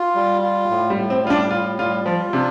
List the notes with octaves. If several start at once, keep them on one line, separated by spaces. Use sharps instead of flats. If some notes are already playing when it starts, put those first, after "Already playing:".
Already playing: F4
G3
F4
A2
G3
A2
C4
G3 F4
D4
A2 F4
G3 F4
F3 F4
C3 D4